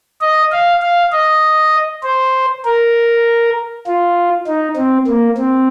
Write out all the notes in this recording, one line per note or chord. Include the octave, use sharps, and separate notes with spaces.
D#5
F5
F5
D#5
C5
A#4
F4
D#4
C4
A#3
C4